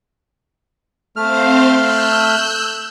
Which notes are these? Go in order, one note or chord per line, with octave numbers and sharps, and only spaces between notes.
A3 C4 C5 F5 F6
E6 F#6 G6